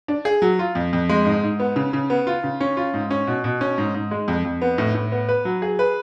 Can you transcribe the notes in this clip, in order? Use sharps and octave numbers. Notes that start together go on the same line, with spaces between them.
D4
G#4
F#3
F4
F2
F2
G#3
G#2
G#2
B3
C#3
C#3
B3
F4
C#3
C#4
F4
G#2
C#4
B2
B2
C#4
G#2
G#2
G#3
F2
F2
B3
A2
A2
B3
B4
F#3
G#4
B4